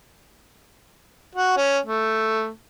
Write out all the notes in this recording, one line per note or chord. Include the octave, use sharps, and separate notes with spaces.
F#4
C#4
A3